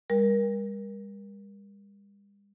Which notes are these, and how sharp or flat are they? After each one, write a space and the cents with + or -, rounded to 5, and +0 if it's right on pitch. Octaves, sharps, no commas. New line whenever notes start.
G3 +40 A#4 +30